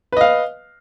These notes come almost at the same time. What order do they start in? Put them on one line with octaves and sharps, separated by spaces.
B4 D#5 F5